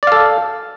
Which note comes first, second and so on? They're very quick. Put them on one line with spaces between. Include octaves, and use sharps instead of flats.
D5 F5 A4